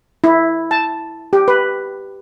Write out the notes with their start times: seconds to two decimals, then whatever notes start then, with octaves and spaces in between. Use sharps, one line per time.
0.24 E4
0.71 A5
1.33 G4
1.48 B4